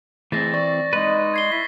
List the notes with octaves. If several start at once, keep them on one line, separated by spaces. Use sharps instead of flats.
E3 A3 C4 G#4 A6 A#6
D5 C#6
G#3 D#4 B4 A#6
G#6 C7 G7
E4 B6